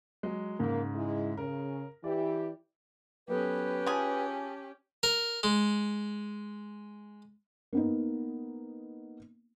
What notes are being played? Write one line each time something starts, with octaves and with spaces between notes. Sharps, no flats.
F#3 G#3
G#2 C#3 A#3
G#3 E4
C#3 A#4
E3 E4 G4 D5
F#3 B3 C#4 G4 A4 B4
F4 G#4 A5
A#4
G#3
A#3 B3 D#4